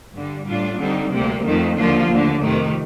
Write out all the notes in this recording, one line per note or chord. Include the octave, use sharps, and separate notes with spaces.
G2 D3 G3
A2 G3 D4 F4
D3 G3 C4 D#4
D2 C3 G3 A#3
F2 D#3 A3
D#2 D3 F3 A#3 F4
D#2 D3 A3
F2 C3 D#3 A3